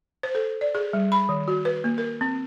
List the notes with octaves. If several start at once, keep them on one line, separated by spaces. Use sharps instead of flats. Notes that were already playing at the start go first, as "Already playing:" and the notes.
C5
A4
D5
G#4
G3
B5
D#3
F#4
B4
A#3
A#4
C4